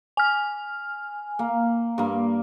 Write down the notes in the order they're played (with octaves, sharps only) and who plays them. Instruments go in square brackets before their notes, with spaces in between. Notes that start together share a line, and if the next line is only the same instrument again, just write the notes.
[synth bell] G#5 F6
[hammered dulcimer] A#3
G2 A#3